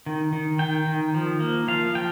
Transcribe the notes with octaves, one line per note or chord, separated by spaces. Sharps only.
D#3
D#3
D#3 G5
D#3
F3
A#3
F3 F5
F3 G5